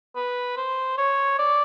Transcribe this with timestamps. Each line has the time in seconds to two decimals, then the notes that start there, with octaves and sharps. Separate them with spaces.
0.16 B4
0.57 C5
0.98 C#5
1.39 D5